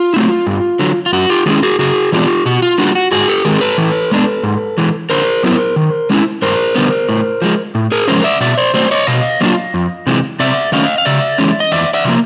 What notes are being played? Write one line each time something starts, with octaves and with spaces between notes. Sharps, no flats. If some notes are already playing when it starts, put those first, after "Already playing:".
Already playing: F4
F#3 A3 C4 E4
G2
D3 F#3
F4
F#2 F#4
F4 G4
D#3 G#3 C#4 E4 F#4 G#4
F#4 G#4
C#3 F#4 G#4
E3 G#3 B3 D4 F4 G4
B2 F#4
F4
G3 A#3 D4 F4 F#4
F#4
G#2 F#4 G#4
G4 A4
D#3 G#3 C4 G#4 A#4
A4 B4
E3
G#3 B3 D4
G#2
E3 G#3
D3 A#4 C5
F#3 B3 E4
D#3
G#3 C#4 E4
G2 A#4 C5
D3 G3 B3
A2
F3 G#3
A2
G#4 A#4
F3 G#3 C#4 A#4 C5
D5 E5
B2 D5 E5
C5 D5
F#3 A3 C4 C5 D5
C#5 D#5
B2 D#5 F5
F#3 A#3 D4 F4
F2
C3 E3 G#3
C3 D5 E5
D#3 F#3 A3 C#4 D#5 F5
F5
C#3 D5 E5
E3 G#3 C#4
D#5
E2 D5 E5
D5 E5
C3 F3 A#3